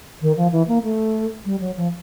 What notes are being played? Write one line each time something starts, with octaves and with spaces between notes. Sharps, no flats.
D#3
F3
E3
A#3
A3
G3
F#3
F3